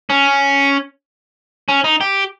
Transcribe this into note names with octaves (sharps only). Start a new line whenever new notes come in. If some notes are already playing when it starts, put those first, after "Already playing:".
C#4
C#4
D#4
G4